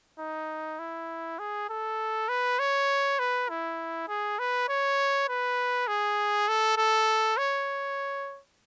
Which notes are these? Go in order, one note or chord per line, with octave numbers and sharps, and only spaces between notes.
D#4
E4
G#4
A4
B4
C#5
B4
E4
G#4
B4
C#5
B4
G#4
A4
A4
C#5